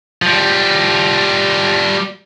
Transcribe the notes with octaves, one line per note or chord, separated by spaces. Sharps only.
F3 G3